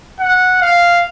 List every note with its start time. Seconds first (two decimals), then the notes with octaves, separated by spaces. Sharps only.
0.20 F#5
0.62 F5